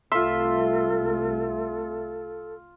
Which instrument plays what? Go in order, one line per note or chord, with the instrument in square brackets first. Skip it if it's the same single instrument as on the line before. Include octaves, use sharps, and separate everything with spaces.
[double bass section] C2 A3 [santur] F4 C6 [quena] A4 [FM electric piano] E5